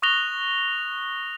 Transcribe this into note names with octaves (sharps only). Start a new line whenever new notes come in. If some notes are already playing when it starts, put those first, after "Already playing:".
C#6 D#6 F#6 A#6 F7 G7